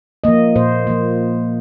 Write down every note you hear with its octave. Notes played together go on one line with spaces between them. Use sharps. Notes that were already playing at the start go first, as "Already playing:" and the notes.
F3 A#3 D#5
A#2 C5
F3 A#3